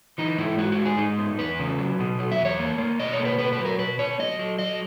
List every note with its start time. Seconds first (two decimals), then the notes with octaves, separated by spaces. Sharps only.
0.18 E3 D#4
0.38 G#2 E4
0.58 G#3 F#4
0.72 F#4
0.79 G#2
0.85 G#4
0.98 G#3 D#4
1.18 B3
1.38 E2 B4
1.59 C#3
1.79 F#3
1.99 B2
2.19 F#3
2.32 E5
2.38 E2
2.45 C#5
2.59 A#3
2.78 A#3
2.99 B2 D#5
3.13 C#5
3.19 A#3
3.25 B4
3.39 B2 B4
3.53 B4
3.58 F#3
3.65 A#4
3.79 B2 B4
3.99 B3 C#5
4.19 F#3 D#5
4.39 F#3
4.59 F#3 D#5